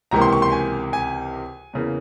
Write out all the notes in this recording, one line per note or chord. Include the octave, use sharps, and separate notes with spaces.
C#2 C3 E3 A#3 A#5
C6
C#6
C6
G#5
G#5
E2 C#3 E3 A#3